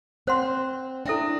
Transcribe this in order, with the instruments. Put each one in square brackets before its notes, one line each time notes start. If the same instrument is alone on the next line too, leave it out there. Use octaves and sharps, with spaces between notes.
[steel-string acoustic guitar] C4 [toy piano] C5 F#5 C6
[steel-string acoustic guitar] D4 [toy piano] E4 A4 E5 G5